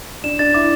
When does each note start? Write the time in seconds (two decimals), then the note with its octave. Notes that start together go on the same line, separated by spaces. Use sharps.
0.24 D4 E7
0.39 D4 A6
0.54 E4 D6